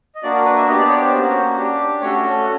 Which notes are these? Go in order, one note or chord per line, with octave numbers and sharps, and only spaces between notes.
D#5
A#3 D4 F#4 D5
A#4
B4
E5
B3 D4 G4 D#5
D5
C#5
C5
A#3 C#4 F#4
D4 G4
A3 C#4 F#4 A4 C#5